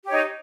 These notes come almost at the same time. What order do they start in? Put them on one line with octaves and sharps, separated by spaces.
G4 C#5 D#4